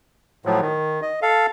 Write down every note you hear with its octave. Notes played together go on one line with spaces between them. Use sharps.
A2 F3 F#3
D#3
D#5
A4 F5